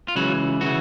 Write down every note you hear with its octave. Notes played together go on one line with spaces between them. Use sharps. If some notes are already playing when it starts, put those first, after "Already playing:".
F4
C#2 C#3 E3 F#3 F#4
C#3 E3 F#3 F#4